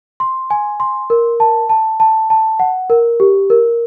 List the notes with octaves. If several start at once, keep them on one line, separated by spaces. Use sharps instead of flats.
C6
G#5
C6
A#4
A5
A5
A5
A5
F#5
A#4
G4
A#4